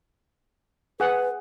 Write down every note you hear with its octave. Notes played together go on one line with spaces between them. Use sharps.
G#4 B4 F#5